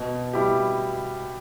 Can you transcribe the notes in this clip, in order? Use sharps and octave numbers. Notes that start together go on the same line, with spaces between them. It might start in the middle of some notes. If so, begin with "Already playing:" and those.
Already playing: B2
G3 E4 G4